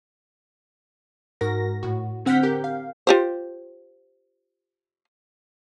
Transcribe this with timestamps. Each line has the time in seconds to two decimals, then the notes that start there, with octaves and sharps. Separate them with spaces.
1.41 G#2 F#4 A#4 A#6
1.83 A2 F#4
2.25 D3 C4 F#5 F6 G6 B6
2.43 G4 A#4 G6
2.64 F5
3.07 F4 G4 C5